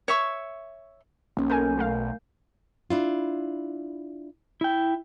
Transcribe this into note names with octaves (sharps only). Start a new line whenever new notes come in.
C#5 E5 C#6
B1 A#3 C#4
A4 A#4 G#5 G6
A3 A#4 F5
D4 E4 F4
E4 G5